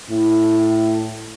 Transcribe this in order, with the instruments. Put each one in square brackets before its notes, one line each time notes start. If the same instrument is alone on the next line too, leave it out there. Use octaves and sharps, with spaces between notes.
[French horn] A2